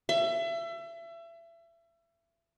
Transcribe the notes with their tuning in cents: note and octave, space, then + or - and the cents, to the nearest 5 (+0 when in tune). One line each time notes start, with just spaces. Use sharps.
E5 +30